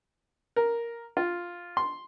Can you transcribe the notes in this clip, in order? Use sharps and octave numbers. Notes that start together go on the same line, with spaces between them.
A#4
F4
C6